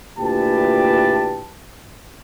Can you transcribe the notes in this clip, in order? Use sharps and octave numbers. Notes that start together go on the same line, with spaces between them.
D2 A#2 E3 G4 B4 A5